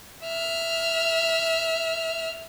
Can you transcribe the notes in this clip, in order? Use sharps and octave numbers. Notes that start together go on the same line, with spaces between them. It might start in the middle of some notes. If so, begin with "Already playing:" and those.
E5 F6